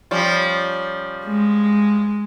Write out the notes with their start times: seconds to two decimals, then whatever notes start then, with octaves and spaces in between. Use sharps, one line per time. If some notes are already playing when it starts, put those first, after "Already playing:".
0.11 F3 G3 C#4
1.25 G#3